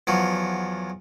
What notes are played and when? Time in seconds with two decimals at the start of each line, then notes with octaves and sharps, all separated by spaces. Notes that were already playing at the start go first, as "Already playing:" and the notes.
0.07 E2 F3 F#3